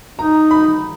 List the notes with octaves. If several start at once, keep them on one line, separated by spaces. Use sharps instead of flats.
D#4 A#5
B5